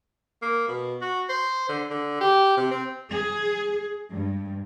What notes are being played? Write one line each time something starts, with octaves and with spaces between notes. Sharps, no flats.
A#3
B2
F#4
C5
D3
D3
G4
C3
C4
G#4
G2